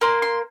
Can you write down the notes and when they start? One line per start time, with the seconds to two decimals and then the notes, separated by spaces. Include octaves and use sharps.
0.01 A#3 C6
0.22 C6